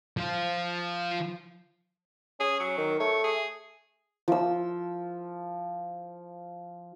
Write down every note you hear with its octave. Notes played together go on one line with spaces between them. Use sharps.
F3 F4
C#4 G#4
F#3
D#3
A3 C#5
G#4
F3 E6